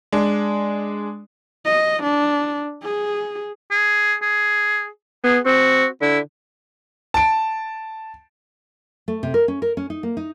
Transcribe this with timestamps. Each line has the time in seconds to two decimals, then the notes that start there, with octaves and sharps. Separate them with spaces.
0.12 G#3 D4
1.65 D#5
2.03 D4
2.83 G#4
3.71 G#4
4.22 G#4
5.24 B3 G#4
5.46 C4 F#4
6.02 D3 E4
7.14 A5 D7
9.08 A3
9.23 C3
9.34 A#4
9.48 C#4
9.62 A#4
9.77 C#4
9.90 D#4
10.03 A#3
10.17 D#4